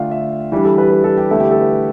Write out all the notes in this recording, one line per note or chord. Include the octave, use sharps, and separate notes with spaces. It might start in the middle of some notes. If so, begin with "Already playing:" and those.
Already playing: D3 A3 D4 F4 F5 G5
E5
E3 G3 D4 G4
A4
B4
B4
A4
G4
D3 A3 E4 A4
G4
A4
B4